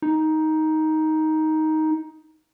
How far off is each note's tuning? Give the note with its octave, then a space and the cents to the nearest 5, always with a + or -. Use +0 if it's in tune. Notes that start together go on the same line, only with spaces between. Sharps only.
D#4 +10